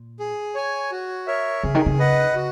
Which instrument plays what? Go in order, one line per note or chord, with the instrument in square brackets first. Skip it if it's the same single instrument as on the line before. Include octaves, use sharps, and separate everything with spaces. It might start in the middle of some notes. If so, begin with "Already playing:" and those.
Already playing: [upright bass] A#2
[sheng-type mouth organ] G#4
C#5 G#5
F#4
A#4 C#5 E5
[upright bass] C#3 [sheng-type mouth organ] G#4
[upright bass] D#3
C#3
[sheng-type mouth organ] B4 D#5 F#5
F#4